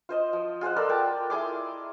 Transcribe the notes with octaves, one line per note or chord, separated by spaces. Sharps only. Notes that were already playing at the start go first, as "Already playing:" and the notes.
F4 C5 D#5
F3
F4 G#4 C5 F#5
A4 A#4 D5 B5
A#4 G5 A5
E4 G#4 C6 D6